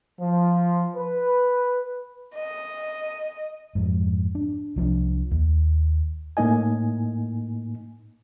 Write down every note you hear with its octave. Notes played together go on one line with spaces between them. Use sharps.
F3
B4
D#5
F2 G#2
D4
C2 F3 C#4 D4
D#2
A2 A#3 D#4 D#5 G#5